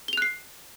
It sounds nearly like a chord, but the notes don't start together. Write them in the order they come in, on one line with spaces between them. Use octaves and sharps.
G7 F7 F#6 C7